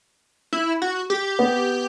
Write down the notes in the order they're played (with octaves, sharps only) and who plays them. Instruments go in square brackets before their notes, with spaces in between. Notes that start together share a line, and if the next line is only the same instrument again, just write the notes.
[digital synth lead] E4
F#4
G4
[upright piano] B3